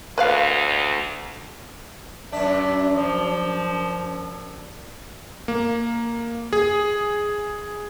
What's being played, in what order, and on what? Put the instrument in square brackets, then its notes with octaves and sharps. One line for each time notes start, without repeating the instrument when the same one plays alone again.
[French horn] D2 [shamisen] B4 D5 F5
[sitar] F#2 D4 [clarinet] E5
[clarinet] F3
[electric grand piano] A#3
G#4